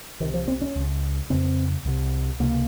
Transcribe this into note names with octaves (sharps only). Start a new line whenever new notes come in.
C2 C3 D#3
F3
C4
C#4
C#2 C#3
F2 C#3 C4
C2 C3
C#2 C3 A#3